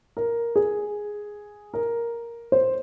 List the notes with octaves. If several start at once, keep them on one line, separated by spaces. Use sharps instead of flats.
A#4
G#4
A#4
C5